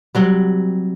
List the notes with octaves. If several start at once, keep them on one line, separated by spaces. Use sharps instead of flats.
C3 F#3 G3